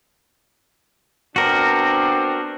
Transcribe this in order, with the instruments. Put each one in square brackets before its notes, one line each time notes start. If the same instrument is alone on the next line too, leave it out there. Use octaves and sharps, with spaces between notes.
[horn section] B3 C4 D4 [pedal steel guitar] F#4 A#4